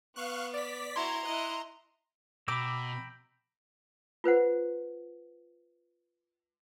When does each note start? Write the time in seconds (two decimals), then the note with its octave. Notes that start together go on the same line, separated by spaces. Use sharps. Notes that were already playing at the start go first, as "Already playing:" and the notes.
0.16 B3 F5 C#6 F#6
0.53 D5 B6
0.96 E4 F#4 A#5 C6 G#6
1.25 E4 D#5 F#6
2.48 B2 G5 A#5 B5 D6 E6
4.24 F4 B4 C5 F#5